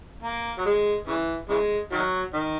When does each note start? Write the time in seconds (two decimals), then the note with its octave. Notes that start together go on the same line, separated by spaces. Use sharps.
0.23 A#3
0.58 F#3
0.66 G#3
1.07 C#3 E3
1.49 C#3 E3 G#3
1.92 D#3 F#3
2.34 D#3